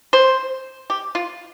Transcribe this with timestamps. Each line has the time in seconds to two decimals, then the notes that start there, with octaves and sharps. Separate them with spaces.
0.13 C5
0.90 G4
1.15 F4